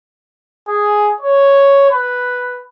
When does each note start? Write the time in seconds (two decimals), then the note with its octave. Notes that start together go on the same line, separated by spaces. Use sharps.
0.67 G#4
1.21 C#5
1.91 B4